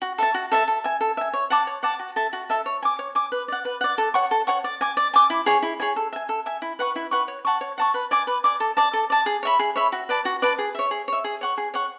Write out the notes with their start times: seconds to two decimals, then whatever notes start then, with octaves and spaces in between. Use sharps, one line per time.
0.02 F#4
0.18 A4 E5 A5
0.34 F#4
0.52 A4 E5 A5
0.68 A4
0.84 E5 G#5
1.01 A4
1.17 E5 G#5
1.33 C#5
1.50 F#5 A5 D6
1.67 C#5
1.83 F#5 A5 D6
1.99 F#4
2.16 A4 E5 A5
2.33 F#4
2.49 A4 E5 A5
2.66 C#5
2.83 G#5 D6
2.99 C#5
3.15 G#5 D6
3.32 B4
3.48 D5 F#5
3.65 B4
3.81 D5 F#5
3.98 A4
4.14 C#5 F#5 C#6
4.31 A4
4.47 C#5 F#5 C#6
4.64 D5
4.81 G#5 D6
4.97 D5
5.14 G#5 D6
5.30 E4
5.46 G#4 C#5 G#5
5.62 E4
5.80 G#4 C#5 G#5
5.96 A4
6.13 E5 G#5
6.29 A4
6.46 E5 G#5
6.62 E4
6.79 B4 F#5 C#6
6.96 E4
7.11 B4 F#5 C#6
7.28 C#5
7.45 F#5 A5 C#6
7.61 C#5
7.78 F#5 A5 C#6
7.94 B4
8.11 D5 G#5 D6
8.27 B4
8.44 D5 G#5 D6
8.60 A4
8.77 D5 A5
8.93 A4
9.10 D5 A5
9.26 G#4
9.43 C#5 E5 B5
9.59 G#4
9.76 C#5 E5 B5
9.92 F#4
10.09 B4 D5 A5
10.25 F#4
10.42 B4 D5 A5
10.59 G#4
10.75 C#5 E5
10.91 G#4
11.08 C#5 E5
11.24 G#4
11.41 C#5 F#5 C#6
11.58 G#4
11.74 C#5 F#5 C#6